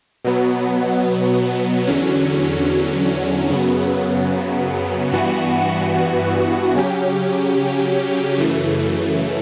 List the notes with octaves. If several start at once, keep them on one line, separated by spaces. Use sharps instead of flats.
B2 F#3 B3
E2 D3 F#3 C#4
F#2 C#3 F#3 B3
G2 E3 B3 F#4
C#3 F#3 C#4 G4
F#2 C#3 E3 A3